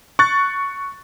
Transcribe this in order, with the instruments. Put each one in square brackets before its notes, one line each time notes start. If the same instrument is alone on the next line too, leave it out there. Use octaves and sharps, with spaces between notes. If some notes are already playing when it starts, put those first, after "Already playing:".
[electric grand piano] C#6 F#6 A6